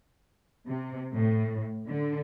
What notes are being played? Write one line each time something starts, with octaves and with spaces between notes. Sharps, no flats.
C3
A2
D3